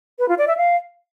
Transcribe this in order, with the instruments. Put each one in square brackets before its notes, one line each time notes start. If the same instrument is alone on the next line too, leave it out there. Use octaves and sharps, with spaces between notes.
[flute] B4
F4
D5
E5
F5